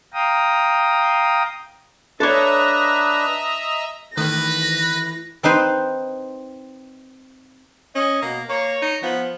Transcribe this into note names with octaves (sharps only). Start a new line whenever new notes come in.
F5 G5 A#5 D#6
D4 A4 B4 C#5 D#5 E5 A#5
D#3 E3 A3 B4 A#6
C4 D#4 B4 C5
C#4 D#5
B2 A#3
A#3 C#5
D#4
F3 B3